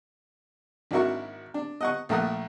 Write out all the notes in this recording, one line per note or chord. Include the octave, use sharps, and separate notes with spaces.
G#1 D4 E4 F#4 A#4 C#6
D4
D#5 F#5 C#6
A#1 A3 A#4 F#5 D#6